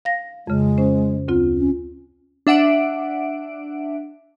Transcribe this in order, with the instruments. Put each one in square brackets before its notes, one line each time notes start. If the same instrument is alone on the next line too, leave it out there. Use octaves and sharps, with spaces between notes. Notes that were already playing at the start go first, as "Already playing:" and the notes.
[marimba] F5 A#6
[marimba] F2 C#3 [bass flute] G#3
[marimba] C#4 C5
D2 C4 F4
[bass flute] C#4
[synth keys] D4 E5 F#5 D7